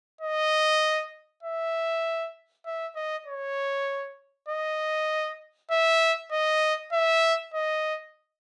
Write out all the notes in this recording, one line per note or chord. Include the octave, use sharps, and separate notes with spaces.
D#5
E5
E5
D#5
C#5
D#5
E5
D#5
E5
D#5